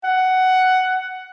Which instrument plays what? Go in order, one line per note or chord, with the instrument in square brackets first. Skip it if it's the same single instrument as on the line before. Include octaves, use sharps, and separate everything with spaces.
[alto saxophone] F#5